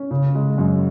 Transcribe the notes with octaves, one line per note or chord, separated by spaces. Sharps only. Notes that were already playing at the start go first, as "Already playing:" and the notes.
Already playing: C#4
C#3
G#3
F#2